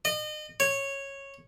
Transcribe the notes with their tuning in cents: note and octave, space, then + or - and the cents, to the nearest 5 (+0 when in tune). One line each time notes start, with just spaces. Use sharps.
D#5 -35
C#5 -10